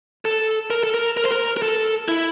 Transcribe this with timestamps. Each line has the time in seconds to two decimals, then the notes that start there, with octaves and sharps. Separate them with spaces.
0.25 A4
0.70 A#4
0.83 A4
0.94 A#4
1.17 A#4
1.24 C5
1.31 A#4
1.57 A#4
1.62 A4
2.08 E4